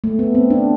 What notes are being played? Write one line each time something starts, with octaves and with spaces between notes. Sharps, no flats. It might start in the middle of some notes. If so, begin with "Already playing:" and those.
A3
B3
C4
D4